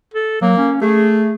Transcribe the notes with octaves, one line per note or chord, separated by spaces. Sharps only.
A4
F#3 A#3
C#4
A3 G#4